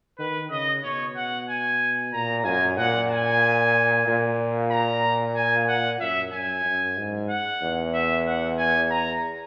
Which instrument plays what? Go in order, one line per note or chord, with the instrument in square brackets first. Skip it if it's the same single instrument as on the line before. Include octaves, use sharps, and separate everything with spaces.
[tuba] D#3 [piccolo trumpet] B4
[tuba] C#3 [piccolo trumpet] D#5
[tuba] B2 [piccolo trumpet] C#5
[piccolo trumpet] F#5
G#5
[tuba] A#2 [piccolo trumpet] A#5
[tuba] F#2 [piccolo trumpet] G#5
[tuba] A#2 [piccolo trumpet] F#5
[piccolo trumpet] G#5
[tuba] A#2
[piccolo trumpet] A#5
G#5
F#5
[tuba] F#2 [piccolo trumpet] E5
[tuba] F#2 [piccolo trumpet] G#5
[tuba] F#2
G#2
[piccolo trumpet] F#5
[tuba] E2
[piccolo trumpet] E5
F#5
G#5
A#5